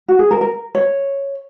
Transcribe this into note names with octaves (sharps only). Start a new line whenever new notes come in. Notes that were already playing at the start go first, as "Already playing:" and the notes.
F#4
G#4
A#4
A#4
C#5